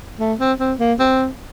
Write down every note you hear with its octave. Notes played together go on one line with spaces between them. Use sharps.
A3
C4
C4
A#3
C4